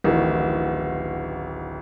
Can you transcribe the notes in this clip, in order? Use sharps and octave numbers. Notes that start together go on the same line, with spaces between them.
D1 A1 D#3